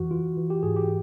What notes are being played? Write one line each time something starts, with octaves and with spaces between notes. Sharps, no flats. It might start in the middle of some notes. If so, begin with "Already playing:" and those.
Already playing: F2 E3 F#4
E3 F4
E3
G4
G#2 G#4
G4